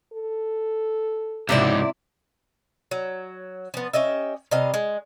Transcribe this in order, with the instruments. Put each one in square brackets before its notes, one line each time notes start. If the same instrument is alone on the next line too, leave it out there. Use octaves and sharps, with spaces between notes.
[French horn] A4
[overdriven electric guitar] C#2 G#2 [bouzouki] C3 E4 D5
[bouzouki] F#3
F3 B3
C#4 G4 D#5 E5
C3 G3 D#5 F5
G#3